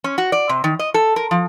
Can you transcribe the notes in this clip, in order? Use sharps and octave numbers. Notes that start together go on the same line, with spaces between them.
C#4
F#4
D5
C3
D#3
D#5
A4
A#4
F3